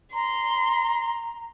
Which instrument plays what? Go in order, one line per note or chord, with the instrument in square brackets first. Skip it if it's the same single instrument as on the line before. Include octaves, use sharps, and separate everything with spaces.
[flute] A#5 [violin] C6